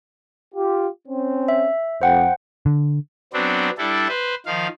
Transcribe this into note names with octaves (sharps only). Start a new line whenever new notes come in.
F4 G4
C4 C#4
E5
F2 C5 F#5 G5
D3
F#3 B3 C4 D4
G3 D4 E4 A4
B4 C5
D#3 F3 F5